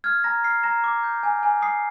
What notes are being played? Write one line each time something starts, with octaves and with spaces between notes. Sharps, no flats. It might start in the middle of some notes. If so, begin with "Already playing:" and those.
F6 G#6
A#5 A#6
F6 C7
A#5 A#6
D6
G6
G#5
G#5
D#6 C7